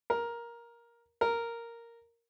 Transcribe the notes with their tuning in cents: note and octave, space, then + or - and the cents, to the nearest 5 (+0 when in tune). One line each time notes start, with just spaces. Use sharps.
A#4 +10
A#4 -5